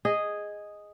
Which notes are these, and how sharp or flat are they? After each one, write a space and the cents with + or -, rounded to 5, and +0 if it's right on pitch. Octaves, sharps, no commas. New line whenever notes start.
G#4 -5 D#5 +0